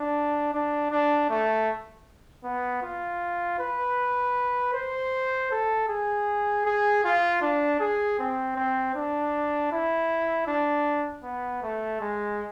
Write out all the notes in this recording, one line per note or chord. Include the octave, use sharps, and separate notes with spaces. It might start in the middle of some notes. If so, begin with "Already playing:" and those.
Already playing: D4
D4
D4
A3
B3
F4
B4
C5
A4
G#4
G#4
F4
D4
G#4
C4
C4
D4
E4
D4
B3
A3
G#3